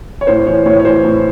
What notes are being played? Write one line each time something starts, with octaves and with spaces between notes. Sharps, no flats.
C#5
A2 C5
E3 C#5
A2 C#5
C#5
E3 C5
A2